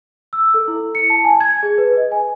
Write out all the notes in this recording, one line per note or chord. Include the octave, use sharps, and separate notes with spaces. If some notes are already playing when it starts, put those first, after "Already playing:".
E6
A4
E4
C#7
A5
G#5
G#6
G#4
B4
D#5
G#5